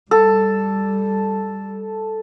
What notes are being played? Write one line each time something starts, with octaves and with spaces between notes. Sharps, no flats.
G3 A4